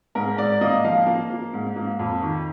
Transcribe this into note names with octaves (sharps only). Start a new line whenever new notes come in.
G#2 A#4
G#2 D5
A#3 D#5
F3 F5
A#3
A#3
G#2
A#3
F2
D#3